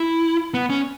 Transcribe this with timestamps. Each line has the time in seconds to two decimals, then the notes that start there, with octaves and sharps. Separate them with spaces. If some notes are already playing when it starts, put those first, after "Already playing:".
Already playing: E4
0.54 B3
0.69 C#4